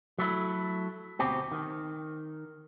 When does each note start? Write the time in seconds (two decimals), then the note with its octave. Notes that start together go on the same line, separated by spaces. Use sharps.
0.19 F#3 A3 E4
1.19 D2 B2 B3 C4 G4
1.52 D#3